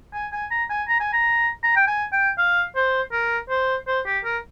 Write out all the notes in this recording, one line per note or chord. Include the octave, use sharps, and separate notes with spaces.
G#5
G#5
A#5
G#5
A#5
G#5
A#5
A#5
G5
G#5
G5
F5
C5
A#4
C5
C5
G4
A#4